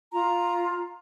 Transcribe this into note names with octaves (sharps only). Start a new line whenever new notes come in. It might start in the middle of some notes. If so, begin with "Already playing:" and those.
F4 A#5